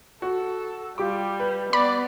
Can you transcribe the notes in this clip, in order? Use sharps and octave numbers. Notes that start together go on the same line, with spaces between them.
F#4 A4
G3 F4 G4 D6
B4
B3 D5 B5